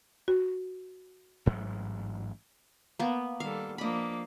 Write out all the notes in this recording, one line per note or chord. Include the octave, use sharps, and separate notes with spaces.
F#4
A1 G#2 F#3
A#3 B3
D#3 G3 A4 F5
F3 A#3 D4 D#5 B5